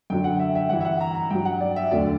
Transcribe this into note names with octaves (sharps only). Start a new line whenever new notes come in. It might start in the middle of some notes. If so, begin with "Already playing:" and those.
F#2 D3 F#3 G5
F#5
E5
E5
G2 E3 F#5
E5
F#5
A#5
A#5
G2 F#3 G5
F#5
D5
E5
D2 D3 F#3 D5